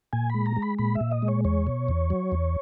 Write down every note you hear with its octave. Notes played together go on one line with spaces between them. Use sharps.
A#2 G#5
G#3 B5
A#5
G#3
B5
A#2 B5
E5
A#2
D#5
G#3
C#5
E2 C#5
B2
E2
F#3
E2